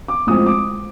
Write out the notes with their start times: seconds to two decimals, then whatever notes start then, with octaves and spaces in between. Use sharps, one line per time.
0.08 D6
0.27 A2 F3 G#3 C4 D#6
0.46 D6